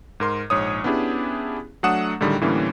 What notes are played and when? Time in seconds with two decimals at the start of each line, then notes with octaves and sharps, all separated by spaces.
0.20 G#2 A#4 C6
0.50 A#1 G#2 C#5 D#6
0.84 B3 C#4 D4 E4 G4 G#4
1.83 F#3 A3 D4 F#5 D#6 E7
2.20 A2 D3 D#3 G3 G#3
2.41 A2 D3 E3 G3 A#3 C#4